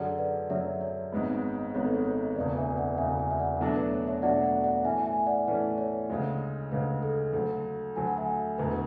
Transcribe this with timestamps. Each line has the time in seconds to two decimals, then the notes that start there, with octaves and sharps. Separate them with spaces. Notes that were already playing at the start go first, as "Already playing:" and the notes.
Already playing: F#2 D3 F#3 C#4 G#4 D5 F#5
0.18 B4 D5
0.50 F#2 D3 F#3 C#4 G#4 C#5 E5
0.81 C#5
1.12 G#1 G#2 G#3 B3
1.74 G#1 G#2 G#3 B3 C#5
1.85 A4
1.95 B4
2.05 C#5
2.36 E1 D2 C#3 B4 D5
2.57 E5 G#5
2.77 D5 F#5
2.98 E1 D2 C#3 E5 G#5
3.19 E5 G#5
3.31 E5
3.39 D5 F#5
3.58 B2 F#3 A3 D4 F#4 F#5
3.67 E5
3.76 B4 D5
3.92 C#5
4.07 C#5 E5
4.22 B2 F#3 A3 D4 F#4 D5 F#5
4.43 D5 F#5
4.64 D5 F#5
4.84 A2 E3 A3 C#4 E5 G#5
5.06 E5 G#5
5.26 D5 F#5
5.47 A2 E3 A3 C#4 B4 D5
5.78 C#5
6.10 D2 C#3 G#3
6.72 D2 C#3 G#3 B4
7.03 A4
7.33 D2 D3 F#3 A3 A4
7.96 D2 D3 F#3 A3 G#5
8.07 F#5
8.17 E5 G#5
8.58 E1 D2 D3 A3 B4